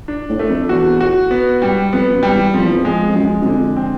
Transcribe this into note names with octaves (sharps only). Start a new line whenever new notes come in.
D4
A2
A3
F2
E2 F#4
F#4
B3
G3
F2 B3
F#2
G3
E2
F2 F3
E2
F2
G#3
F2
F#2 G#3
F#2
F2 D3
C4